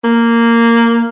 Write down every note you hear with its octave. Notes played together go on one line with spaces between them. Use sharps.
A#3